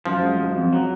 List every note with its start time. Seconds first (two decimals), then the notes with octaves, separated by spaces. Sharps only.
0.05 F#2 F3
0.23 G#3
0.39 F#2
0.56 F2
0.73 F#3